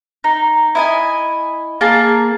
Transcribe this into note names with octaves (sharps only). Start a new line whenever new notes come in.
D#4
E4 D#5 G#5
A#3 G#4 A5